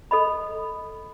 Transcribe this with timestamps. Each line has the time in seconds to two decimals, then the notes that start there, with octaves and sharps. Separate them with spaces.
0.11 A4 D#5 B5